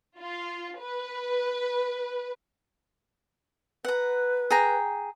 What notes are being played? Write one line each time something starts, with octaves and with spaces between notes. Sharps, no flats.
F4
B4
B4 F#5 A#5
G#4 G5 A#5